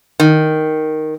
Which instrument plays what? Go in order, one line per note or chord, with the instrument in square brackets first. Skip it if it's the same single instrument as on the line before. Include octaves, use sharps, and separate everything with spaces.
[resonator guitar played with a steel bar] D#3